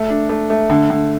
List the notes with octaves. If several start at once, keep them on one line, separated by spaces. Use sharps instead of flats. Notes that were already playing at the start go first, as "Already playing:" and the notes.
Already playing: A3
D4
A3
A3
D3
D3